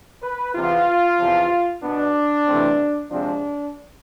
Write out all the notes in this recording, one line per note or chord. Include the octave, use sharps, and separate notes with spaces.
B4
E2 C3 E3 B3 F4
E2 C3 F3
B2 B3 D4
C3 E3 A3 C4
C3 F3 G#3 C4 D4